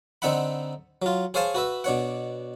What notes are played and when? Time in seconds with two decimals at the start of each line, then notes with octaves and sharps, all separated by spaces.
0.22 D3 C4 D#4 E5 F#5 B5
1.02 F#3 F4
1.34 G#4 C5 C#5 F5 G#5 A5
1.55 F#4 B4 E5
1.84 B2 D4 C#5 F#5